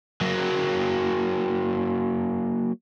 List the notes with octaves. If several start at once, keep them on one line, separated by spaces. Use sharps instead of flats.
F#3 A#3